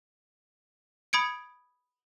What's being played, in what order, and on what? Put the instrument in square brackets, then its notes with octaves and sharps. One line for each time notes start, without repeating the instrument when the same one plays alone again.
[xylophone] B5 D#6 G#6 C#7 D7